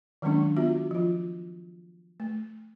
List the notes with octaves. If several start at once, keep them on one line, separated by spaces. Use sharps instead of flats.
D#3 F#3 G#3 A#3 C#4 D4
B3 F4 F#4 E5
F3 F4
A3